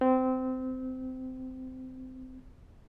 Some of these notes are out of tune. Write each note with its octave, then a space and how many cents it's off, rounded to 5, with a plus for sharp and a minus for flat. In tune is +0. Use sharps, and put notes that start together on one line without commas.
C4 -20